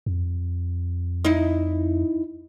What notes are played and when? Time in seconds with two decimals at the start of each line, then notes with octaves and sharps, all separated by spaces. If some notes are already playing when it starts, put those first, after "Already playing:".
0.06 F2
1.25 D#4 E4